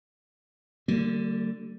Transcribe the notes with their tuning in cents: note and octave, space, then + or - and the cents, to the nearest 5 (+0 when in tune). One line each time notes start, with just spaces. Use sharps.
D3 +0 G3 -40 A#3 -40